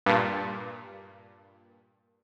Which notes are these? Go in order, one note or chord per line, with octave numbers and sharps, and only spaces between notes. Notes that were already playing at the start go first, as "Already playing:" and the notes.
G2 A#2